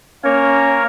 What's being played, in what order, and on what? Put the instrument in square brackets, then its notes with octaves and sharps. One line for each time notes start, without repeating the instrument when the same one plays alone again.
[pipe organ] A#3 A#4 C#5 [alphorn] C#4